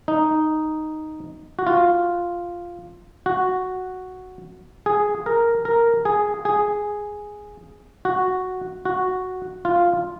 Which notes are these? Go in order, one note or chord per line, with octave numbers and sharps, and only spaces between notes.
D#4
F#4
F4
F#4
G#4
A#4
A#4
G#4
G#4
F#4
F#4
F4